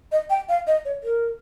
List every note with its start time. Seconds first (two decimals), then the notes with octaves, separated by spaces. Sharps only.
0.12 D#5
0.30 G5
0.49 F5
0.67 D#5
0.85 C#5
1.03 A#4